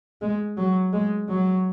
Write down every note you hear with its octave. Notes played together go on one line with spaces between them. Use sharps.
G#3
F#3
G#3
F#3